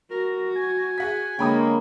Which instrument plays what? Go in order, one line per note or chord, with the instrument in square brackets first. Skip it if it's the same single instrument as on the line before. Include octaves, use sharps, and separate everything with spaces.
[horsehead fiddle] F#4 [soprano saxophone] A#4
[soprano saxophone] G#5
[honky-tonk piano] G#4 F#5 B6
[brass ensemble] D3 G#3 A#3 [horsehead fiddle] C#5 [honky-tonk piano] G5 B5 D#6